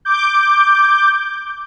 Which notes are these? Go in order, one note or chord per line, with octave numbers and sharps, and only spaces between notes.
D6 G6